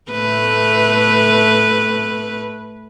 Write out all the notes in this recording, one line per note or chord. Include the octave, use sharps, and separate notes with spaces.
A2 A3 B4